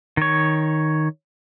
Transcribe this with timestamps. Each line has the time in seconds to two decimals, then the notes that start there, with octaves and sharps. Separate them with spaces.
0.17 D#3 C#5